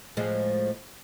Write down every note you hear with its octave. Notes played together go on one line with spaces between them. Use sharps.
A2 F3 G#3